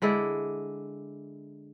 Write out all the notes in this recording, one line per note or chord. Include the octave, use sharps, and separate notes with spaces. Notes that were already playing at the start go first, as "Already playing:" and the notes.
D3 G#3 E4 D5